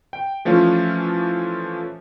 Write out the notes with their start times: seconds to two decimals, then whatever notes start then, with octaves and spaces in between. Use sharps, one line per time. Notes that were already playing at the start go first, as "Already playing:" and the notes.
0.13 G5
0.45 E3 F3 A3 C#4 F4